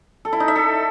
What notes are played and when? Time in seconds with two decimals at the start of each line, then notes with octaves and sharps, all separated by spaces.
0.25 A4
0.33 E4
0.40 D#4
0.48 E5
0.56 A4